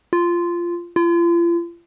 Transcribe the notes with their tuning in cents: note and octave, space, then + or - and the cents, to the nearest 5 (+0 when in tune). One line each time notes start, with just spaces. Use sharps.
F4 -15
F4 -40